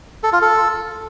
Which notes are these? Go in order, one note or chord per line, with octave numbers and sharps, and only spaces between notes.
A4
F4
A4